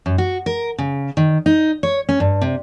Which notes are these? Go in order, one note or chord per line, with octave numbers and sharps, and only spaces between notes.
F#2
F#4
A#4
C#3
D#3
D#4
C#5
C#4
G2
C3